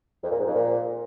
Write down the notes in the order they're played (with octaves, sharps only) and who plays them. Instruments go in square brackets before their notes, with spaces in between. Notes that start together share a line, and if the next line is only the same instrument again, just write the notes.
[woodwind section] F2
A#2
G#2
F2
A#2